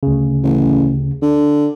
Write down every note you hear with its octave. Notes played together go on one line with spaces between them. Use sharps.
D2 C#3
A1
D3